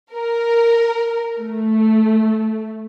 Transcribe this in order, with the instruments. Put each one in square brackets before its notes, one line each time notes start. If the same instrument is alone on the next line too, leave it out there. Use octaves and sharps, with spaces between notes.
[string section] A#4
A3